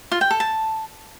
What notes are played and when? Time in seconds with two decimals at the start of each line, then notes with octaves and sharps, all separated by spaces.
0.12 F4
0.21 G5
0.31 A4
0.40 A5